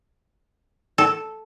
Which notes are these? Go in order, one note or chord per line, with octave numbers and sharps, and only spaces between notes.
A4